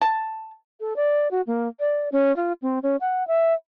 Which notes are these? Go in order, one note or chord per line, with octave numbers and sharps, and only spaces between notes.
A5
A4
D5
F#4
A#3
D5
C#4
F4
C4
C#4
F#5
E5